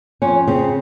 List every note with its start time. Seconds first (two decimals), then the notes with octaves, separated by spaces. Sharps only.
0.22 F2 C#4
0.47 C#3 C4